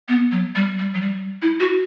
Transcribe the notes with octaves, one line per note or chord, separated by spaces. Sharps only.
B3
F#3
G3
G3
F#3
G3
E4
F#4